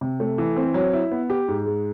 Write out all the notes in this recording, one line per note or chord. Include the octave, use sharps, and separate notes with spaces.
C3
A3
E3
C4
F#3
E4
B3
G4
G#2
G#3